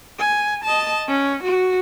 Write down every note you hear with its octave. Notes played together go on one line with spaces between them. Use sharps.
G#5
D#5 A5
C#4
F#4